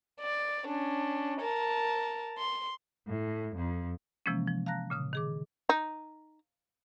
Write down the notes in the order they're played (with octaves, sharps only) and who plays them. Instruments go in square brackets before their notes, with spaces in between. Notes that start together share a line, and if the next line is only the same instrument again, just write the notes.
[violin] D5
C#4 D4
A#4 A5
C6
[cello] A2
F2
[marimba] C3 E3 F3 G#3 A#3 C#4
F3
F5 A5 A#5 F#6 A#6
A#2 C#3 D#6
D#3 G#4 D6
[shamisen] D#4